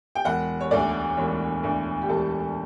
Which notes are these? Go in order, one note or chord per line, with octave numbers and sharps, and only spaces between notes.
G5
E1 F#5
C#5
D2 D3 A3 D5
E1 C#5
D2 D3 A3
G4
E1 A4